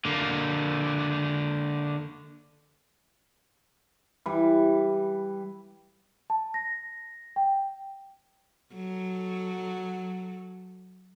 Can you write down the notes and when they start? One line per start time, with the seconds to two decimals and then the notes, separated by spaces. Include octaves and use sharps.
0.05 D3 A#3
4.26 E3 G3 B4
6.30 A5
6.54 A#6
7.36 G5
8.74 F#3 A4